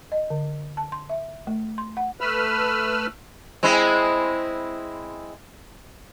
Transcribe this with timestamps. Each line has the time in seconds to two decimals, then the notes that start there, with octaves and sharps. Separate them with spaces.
0.12 D#5
0.30 D3
0.77 A5
0.92 C6
1.10 E5
1.47 A3
1.78 C6
1.97 F#5
2.21 A3 B4 B5 E6 F6
3.63 G#3 C4 E4